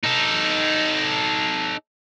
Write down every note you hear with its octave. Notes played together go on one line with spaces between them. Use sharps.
D#4 A4